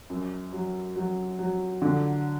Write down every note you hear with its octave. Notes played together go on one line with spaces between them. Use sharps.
F#2
F#3
F#3
F#3
D3